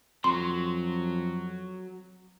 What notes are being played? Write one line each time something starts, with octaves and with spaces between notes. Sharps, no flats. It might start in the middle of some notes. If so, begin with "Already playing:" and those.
F2 F#3 C6